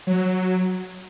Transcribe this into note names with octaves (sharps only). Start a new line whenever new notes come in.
F#3